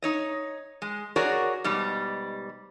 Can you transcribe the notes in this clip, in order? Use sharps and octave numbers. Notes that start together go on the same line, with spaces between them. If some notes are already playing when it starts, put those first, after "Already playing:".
D#4 C#5 D#5
G#3
F#4 G#4 A#4 C#5 D5
G#2 B2 G3